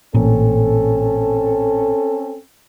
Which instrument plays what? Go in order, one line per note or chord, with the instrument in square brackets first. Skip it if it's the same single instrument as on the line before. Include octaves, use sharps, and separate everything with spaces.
[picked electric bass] A1 A#2 [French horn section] C4 C#4 A4